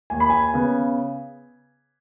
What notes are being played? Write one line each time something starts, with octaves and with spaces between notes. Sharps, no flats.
D#2 G#5
B5
G#5
C#3 B3